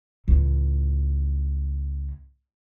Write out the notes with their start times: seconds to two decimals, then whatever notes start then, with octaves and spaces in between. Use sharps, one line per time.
0.28 C#2 A2